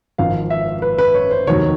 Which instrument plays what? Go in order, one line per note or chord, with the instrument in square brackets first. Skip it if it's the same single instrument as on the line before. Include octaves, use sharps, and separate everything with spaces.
[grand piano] G#1 G#2 F3 F5
E5
B4
B4
C#5
C5
F1 D#2 D#3 F#3 C#5